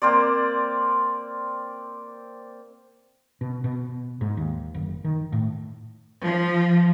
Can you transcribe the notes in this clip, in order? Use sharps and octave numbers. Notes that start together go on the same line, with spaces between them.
A#3 C4 C5 D5
B2
B2
G#2
D#2
F#1
D#3
A2
F3